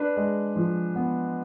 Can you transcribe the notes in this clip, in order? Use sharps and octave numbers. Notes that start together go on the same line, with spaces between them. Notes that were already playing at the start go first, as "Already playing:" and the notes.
Already playing: D4 B4
G#3
F3
B3